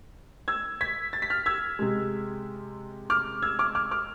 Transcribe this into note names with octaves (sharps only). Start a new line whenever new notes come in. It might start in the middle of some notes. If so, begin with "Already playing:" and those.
E6 G#6
G#6 B6
A6
B6
F6 A6
E6 G#6
C3 G#3
D6 F6
E6 G#6
D6 F6
D6 F6
D6 F6